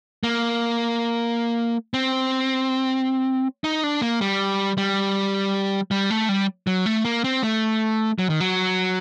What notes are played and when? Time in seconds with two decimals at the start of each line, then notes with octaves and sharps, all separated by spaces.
0.23 A#3
1.94 C4
3.64 D#4
3.84 D4
4.01 A#3
4.21 G3
4.78 G3
5.91 G3
6.10 A3
6.29 G3
6.67 F#3
6.86 A3
7.05 A#3
7.24 C4
7.43 A3
8.19 F#3
8.30 D#3
8.40 F#3